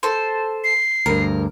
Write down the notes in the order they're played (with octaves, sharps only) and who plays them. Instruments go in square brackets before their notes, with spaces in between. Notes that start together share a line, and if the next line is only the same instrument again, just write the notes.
[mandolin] A4 C5
[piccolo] C7
[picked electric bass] D2 G2 [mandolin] A#4